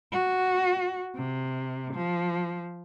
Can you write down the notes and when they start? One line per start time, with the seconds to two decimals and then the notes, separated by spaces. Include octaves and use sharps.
0.12 F#4
1.16 C3
1.94 F3